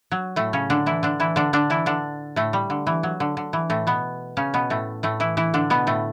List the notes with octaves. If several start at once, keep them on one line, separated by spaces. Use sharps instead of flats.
F#3
A2 A3
C#3 C#4
D3 D4
E3 E4
D3 D4
E3 E4
D3 D4
D3 D4
E3 E4
D3 D4
A2 A3
G3
D3
E3
F#3
D3
D3
E3
A2 A3
B2 B3
C#3 C#4
B2 B3
A2 A3
A2 A3
E3 E4
E3 E4
D3 D4
B2 B3
A2 A3